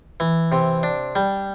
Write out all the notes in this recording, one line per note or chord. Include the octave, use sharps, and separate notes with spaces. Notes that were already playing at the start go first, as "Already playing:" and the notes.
E3
C3
D4
G3